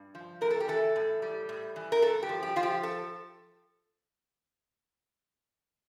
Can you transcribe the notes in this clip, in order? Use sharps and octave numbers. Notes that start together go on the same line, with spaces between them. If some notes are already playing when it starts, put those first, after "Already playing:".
Already playing: G2
F3
A2 A#4
A4
G4
E3 A4
A2
G3
A2
E3
A#4
G2 A4
G4
F3
G4
F3 F4
G4
A4